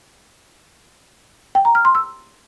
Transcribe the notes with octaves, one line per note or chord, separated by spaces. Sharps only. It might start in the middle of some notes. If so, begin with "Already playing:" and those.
G5
A#5
F6
C6
E6